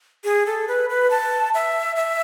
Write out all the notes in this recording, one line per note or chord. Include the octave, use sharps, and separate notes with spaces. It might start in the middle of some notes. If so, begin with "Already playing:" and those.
G#4
A4
B4
B4
A5
E5
E5